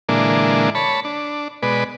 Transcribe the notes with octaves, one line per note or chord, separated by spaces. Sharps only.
A#2 D3 E3 G#3 A#3 D4
C#5 A5 B5
D4
B2 G#3 B4 D5